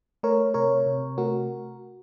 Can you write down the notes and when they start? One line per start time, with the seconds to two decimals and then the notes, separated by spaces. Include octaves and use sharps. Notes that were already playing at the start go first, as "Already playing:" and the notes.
0.23 A3 A#4 C#5
0.54 C3 A#4 C#5
0.86 C3
1.18 A3 F#4 A#4